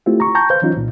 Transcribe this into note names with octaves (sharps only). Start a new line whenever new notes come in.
A3 C4 E4 F4 G4
A#5 C#6
G5 A5 A#5 C#6 G6
B4 C5 F5 G6
E3 F#3 C#4 D#4 F4
C2 A#2